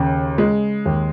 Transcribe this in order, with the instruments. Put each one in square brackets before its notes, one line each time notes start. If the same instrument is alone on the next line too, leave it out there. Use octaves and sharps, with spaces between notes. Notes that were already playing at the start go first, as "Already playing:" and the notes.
Already playing: [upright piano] D#2 C#3
G#3
D#2